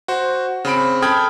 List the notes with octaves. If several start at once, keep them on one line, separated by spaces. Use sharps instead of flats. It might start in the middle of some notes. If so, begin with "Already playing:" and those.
F#4 C5
C#3 C4 B5 D7
A4 G5 B5 D#6 F6 G#6